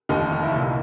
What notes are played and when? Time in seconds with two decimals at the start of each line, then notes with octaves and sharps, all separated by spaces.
0.09 F1 D#2 D3 D#4
0.32 D#4
0.44 E4
0.56 C2 A#2